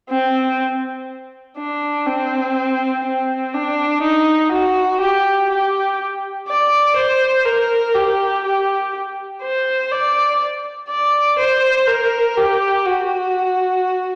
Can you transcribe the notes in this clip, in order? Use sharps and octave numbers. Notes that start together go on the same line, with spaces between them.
C4
D4
C4
C4
D4
D#4
F#4
G4
G4
D5
C5
A#4
G4
G4
C5
D5
D5
C5
A#4
G4
F#4